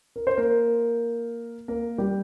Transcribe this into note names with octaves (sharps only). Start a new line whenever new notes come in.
A#4
C5
A#3 A#4
A#3 A#4
G3 G4